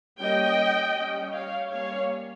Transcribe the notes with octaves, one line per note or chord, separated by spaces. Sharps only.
G3 A#3 C#4 D#5 G5
G3 C#4
C#5 F5
G3 A#3 C#4 C#5 F5